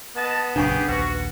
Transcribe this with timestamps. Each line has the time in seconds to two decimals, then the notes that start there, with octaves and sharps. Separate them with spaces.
0.16 B3 D#5 A5
0.56 A#1 F#2 C#3 D4 G4 G#4 G#5 C#6
0.88 A#1 D#2 F#4 B4